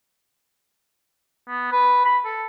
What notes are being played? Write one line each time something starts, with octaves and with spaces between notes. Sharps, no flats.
B3
B4
B5
A4